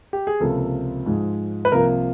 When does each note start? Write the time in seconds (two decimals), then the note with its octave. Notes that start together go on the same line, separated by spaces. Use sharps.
0.13 G4
0.27 G#4
0.40 C#2 C3 F3 A#3 A4
1.06 G#2 F3 G#3
1.65 B4
1.72 C2 C3 F3 A#3 A#4